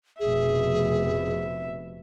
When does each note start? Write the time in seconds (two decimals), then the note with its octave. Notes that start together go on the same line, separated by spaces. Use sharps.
0.20 F1 B2 G#4 E5